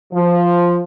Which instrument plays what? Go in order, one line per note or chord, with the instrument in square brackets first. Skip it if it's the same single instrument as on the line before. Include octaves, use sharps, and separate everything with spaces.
[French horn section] F3